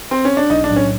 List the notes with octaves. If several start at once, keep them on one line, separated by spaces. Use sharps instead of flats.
C4
C#4
D4
B1 D#4
D4
A2 F#3
C#4